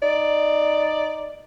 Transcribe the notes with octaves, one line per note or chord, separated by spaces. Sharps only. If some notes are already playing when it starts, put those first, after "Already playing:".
D#4 D5